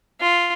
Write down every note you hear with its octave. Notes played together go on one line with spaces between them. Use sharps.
F4